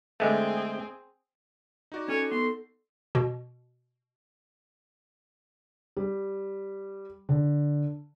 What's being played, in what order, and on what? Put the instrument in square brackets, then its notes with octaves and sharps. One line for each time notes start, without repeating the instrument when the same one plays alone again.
[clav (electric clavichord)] D3 G#3 A3 [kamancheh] C4 G#4
[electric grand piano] D#4 F#4 D5
[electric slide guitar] C#4 G#5 [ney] A4 [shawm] C#5
[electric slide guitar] B3 [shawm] C6
[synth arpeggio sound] B2
[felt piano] G3
D3